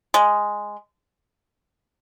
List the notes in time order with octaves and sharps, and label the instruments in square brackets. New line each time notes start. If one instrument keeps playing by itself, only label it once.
[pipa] G#3